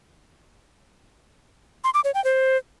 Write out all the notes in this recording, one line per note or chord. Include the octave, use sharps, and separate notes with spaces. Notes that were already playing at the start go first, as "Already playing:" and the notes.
C6
D6
C#5
G5
C5